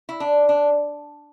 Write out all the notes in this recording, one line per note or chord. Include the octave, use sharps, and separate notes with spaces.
E4
D4
D4